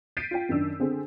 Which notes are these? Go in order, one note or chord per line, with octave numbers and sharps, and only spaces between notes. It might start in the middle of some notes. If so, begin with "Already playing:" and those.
G6 A6 B6 C7 D7 D#7
F4 G5
F#2 D#3 D4 E6
D3 C4 G#4 C5